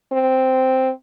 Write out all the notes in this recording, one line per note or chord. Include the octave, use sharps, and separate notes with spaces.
C4